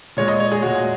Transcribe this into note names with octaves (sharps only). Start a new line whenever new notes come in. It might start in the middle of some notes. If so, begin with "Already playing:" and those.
A#2 G#3 C#5
D#5
C#5
G#4
A#2 G#3 F#4